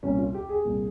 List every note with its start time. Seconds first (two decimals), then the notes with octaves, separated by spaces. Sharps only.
0.03 C2 A#2 C#4
0.18 F4
0.34 G4
0.49 G#4
0.65 C2 A#2